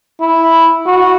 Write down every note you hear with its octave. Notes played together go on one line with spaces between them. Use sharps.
E4
F#4